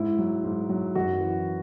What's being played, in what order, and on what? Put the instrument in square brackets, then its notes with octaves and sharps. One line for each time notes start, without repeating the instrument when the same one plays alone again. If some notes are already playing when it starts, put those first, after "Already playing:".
Already playing: [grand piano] G#2 E4
F#3
G#2
F#3
F#2 F#4
E3